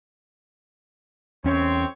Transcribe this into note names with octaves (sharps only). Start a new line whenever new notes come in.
E2 C4 C#4 C#5